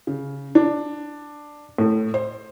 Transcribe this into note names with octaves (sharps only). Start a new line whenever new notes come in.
C#3
D4
A2
C5